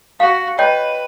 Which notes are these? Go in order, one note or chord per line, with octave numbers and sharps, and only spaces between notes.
F#4 F5
B4 C#5 D#5 G5